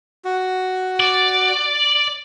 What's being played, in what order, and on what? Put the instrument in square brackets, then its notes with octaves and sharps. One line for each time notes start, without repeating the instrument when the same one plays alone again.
[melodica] F#4
[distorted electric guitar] D5